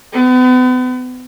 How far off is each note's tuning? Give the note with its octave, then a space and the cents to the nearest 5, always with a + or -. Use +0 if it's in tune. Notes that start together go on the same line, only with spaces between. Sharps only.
B3 +40